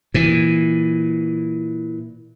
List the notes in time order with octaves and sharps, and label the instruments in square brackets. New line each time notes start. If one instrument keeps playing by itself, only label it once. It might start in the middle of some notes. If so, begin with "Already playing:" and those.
[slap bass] A#2 E3